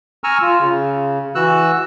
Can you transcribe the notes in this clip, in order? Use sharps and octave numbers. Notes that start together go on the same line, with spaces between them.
G#5 A#5 C#6 E6 F6
F4
C#3
E3 F#4 E6 F#6